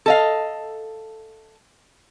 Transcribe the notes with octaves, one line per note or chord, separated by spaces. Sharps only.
A4 D#5 F5